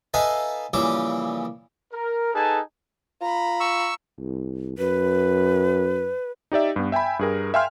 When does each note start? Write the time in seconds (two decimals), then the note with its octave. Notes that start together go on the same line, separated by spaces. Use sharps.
0.14 D#4 A4 B4 E5 F5 G#5
0.73 A#1 C#3 E3 G3 D6
1.92 A#4
2.33 D#4 G#4 A4 B4 G#5 A5
3.21 F4 A#5 B5
3.60 C#6 E6
4.20 C2
4.78 F#2 B4
6.52 D#4 G4 D5 E5
6.76 G2 B3
6.92 E5 G5 G#5 B5
7.19 G2 G#4 A#4
7.54 E5 F5 G5 G#5 C6 F6